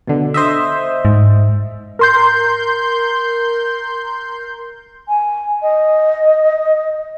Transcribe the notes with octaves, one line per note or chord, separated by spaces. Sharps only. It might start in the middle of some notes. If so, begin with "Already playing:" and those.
B2 D3
C5 D#5 E5
G#2
A#4 C6 G6
G#5
D#5